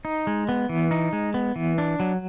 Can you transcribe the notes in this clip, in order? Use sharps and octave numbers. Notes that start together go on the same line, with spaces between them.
D#4
G#3
B3
E3
D#4
G#3
B3
E3
D4
F#3